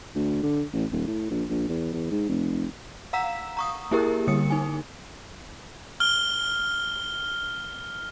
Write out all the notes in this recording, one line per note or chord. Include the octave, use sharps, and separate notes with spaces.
D2
D3
A1
D#1
A2
A#1
A#1
E2
E2
G#2
F1
F5 F#5 A#5 E6 B6 E7
A#5 C#6 D#6
A#3 E4 G4 G#4 A#4
D3 G3 D#6 C#7
D#4 G#5
F6 G7